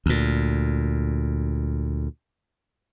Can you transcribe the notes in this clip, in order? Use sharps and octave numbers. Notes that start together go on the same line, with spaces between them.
D2 A#2